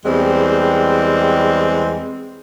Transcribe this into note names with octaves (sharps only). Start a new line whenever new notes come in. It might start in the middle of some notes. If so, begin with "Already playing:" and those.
E2 G3 G#3 C4